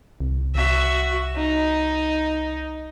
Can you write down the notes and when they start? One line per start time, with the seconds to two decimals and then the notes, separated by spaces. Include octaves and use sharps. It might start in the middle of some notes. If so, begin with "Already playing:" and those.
0.20 C2
0.55 C2 F#4 E5
1.37 D#4